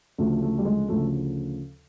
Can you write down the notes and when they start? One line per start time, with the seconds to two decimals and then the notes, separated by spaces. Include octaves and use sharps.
0.18 D2 C#3 F3 A3
0.42 A3
0.58 G3
0.65 G#3
0.88 D2 C#3 F3 A3